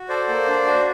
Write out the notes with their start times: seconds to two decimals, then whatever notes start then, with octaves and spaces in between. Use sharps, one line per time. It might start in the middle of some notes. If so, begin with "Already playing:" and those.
Already playing: F#4
0.09 A4 C5 D5
0.29 A#3
0.48 D4
0.66 F#4